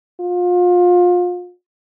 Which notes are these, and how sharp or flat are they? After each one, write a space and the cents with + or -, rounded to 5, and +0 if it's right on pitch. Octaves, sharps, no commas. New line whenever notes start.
F4 +30